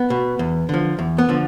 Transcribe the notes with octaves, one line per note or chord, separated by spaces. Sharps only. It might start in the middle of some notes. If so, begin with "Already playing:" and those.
Already playing: B3
B2
E2
D3 F3
E2
B3
D3 F3